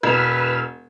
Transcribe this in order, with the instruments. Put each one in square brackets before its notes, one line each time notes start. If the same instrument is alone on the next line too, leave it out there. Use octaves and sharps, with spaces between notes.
[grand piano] E1 [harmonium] B4 [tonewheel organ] B5 E6 F6